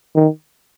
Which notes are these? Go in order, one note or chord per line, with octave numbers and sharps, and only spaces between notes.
D#3